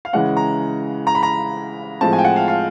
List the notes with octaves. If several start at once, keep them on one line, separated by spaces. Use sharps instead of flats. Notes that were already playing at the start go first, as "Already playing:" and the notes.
F5
C#3 E3 G#3 C#4 F#5
A#5
A#5
B5
A#5
A2 F3 G#3 C4 A5
G#5
G5
F#5
F5
F5